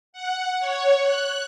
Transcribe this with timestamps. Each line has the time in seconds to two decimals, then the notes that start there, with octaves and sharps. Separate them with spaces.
0.13 F#5
0.59 C#5
1.02 F#6